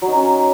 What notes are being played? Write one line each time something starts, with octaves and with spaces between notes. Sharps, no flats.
F#3
D#4
C#4